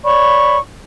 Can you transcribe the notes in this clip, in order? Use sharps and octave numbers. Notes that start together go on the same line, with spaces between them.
C#5 D5 B5 C#6